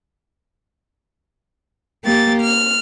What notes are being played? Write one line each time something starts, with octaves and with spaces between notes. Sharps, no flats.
A#3 G4 A6
F6